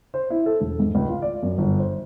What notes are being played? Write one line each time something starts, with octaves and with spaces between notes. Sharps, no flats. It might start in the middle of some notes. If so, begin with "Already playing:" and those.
C5
E4
A4
E1
G#2
C#2
F4
D5
F#2
G1
C5